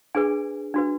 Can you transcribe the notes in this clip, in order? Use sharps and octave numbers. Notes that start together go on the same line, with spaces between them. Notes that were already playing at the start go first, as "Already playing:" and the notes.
D4 G#4 B4 G#5
D4 F#4 B4